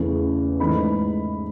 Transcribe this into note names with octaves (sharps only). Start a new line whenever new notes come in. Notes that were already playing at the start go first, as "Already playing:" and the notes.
Already playing: E2 C#3 E3 A3 C#4
G#2 E3 A3 D#4 B5